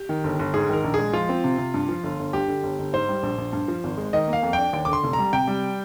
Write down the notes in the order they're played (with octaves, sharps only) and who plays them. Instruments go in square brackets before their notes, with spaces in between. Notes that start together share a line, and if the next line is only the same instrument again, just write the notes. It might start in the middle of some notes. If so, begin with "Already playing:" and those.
Already playing: [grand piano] G4
[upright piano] D#3
G1
G1
[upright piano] G#2 [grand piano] G#4
[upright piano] D#3 [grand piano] A#4
[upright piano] A#1
[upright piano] G#3 [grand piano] G#4
[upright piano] F3 [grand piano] F4
[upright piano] C4
C3
C3
G2
F3
G1
G1
[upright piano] G2 [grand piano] G4
[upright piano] D3
G1
G1
[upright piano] G#2 [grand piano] C5
[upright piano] G3
A#1
A#1
G2
F3
G#1
G#3
[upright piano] D#3 [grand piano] D#5
[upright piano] A#3
[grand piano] F5
[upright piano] F2
[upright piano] D4 [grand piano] G5
[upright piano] D#2 [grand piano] G5
[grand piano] D6
[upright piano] D3 [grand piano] C6
[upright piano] F1
[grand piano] A#5
[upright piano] G3
[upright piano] C3 [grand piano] G5
[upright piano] G3